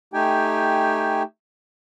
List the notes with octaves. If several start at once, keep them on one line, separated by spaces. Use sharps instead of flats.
A3 D#4 G4 G5 G#5